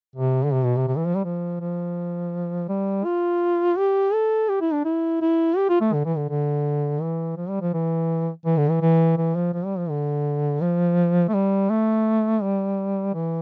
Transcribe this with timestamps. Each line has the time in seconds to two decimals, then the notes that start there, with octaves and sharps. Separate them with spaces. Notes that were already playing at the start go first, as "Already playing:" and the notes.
0.16 C3
0.45 D3
0.53 C3
0.64 B2
0.77 C3
0.88 C3
0.97 E3
1.07 F3
1.16 G3
1.25 F3
1.61 F3
2.69 G3
3.05 F4
3.77 G4
4.13 A4
4.49 G4
4.61 E4
4.73 D4
4.85 E4
5.22 E4
5.57 G4
5.69 F4
5.81 A3
5.94 D3
6.06 E3
6.17 D3
6.30 D3
7.01 E3
7.37 F3
7.49 G3
7.62 F3
7.74 E3
8.46 E3
8.58 D3
8.70 E3
8.82 E3
9.18 E3
9.36 F3
9.54 F3
9.66 G3
9.78 F3
9.90 D3
10.62 F3
11.28 A3
11.34 G3
11.70 A3
12.42 G3
13.15 E3